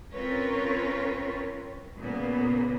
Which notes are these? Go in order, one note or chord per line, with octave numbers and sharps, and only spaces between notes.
C4 C#4 F4 A#4 B4 C#5
A#2 C#3 A#3 B3